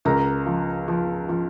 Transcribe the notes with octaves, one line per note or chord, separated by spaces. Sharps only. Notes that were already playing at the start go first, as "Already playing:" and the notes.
C#2 A#4 A#5
F3
F3
F3